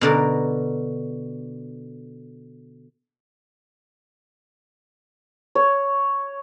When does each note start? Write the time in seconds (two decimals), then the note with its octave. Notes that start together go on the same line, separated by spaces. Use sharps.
0.01 B2 D3 A#4
5.55 C#5